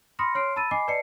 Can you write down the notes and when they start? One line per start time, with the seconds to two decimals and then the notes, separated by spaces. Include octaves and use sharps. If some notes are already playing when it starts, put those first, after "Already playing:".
0.19 B5 C6 D#6 F6 A#6 C#7
0.35 C#5 C6 F6 C7 D7
0.56 A5 B5 E6 A6 D#7
0.71 D#5 G#5 B5 D6 C7
0.88 B4 D5 D#5 A5 C7 C#7